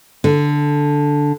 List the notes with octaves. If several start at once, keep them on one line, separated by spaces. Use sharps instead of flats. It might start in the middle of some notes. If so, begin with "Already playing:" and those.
D3